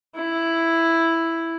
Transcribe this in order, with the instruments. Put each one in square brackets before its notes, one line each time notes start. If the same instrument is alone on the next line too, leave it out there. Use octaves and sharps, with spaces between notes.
[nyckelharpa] E4